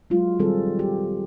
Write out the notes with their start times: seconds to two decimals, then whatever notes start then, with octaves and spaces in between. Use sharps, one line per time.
0.10 F#3 G#3 F4
0.39 A#2 D#3 G3 C4 G#4 A4
0.79 G4